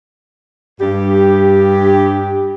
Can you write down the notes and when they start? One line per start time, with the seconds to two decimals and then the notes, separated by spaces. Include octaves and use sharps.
0.81 G2 G4